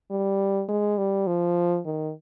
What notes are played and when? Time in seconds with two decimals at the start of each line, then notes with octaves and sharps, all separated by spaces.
0.11 G3
0.69 G#3
0.98 G3
1.27 F3
1.85 D#3